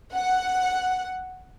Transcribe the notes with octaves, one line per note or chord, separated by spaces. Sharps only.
F#5